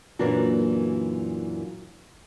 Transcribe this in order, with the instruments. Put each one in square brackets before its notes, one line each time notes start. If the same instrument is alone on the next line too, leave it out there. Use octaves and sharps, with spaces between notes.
[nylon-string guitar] F#2 A#2 E3 A#3 D4 F#4